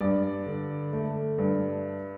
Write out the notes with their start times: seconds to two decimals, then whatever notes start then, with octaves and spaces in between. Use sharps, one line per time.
0.01 G2 D5
0.46 D3
0.93 A3
1.38 G2